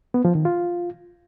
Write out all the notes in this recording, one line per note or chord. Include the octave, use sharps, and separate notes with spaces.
B3
F3
D#3
F4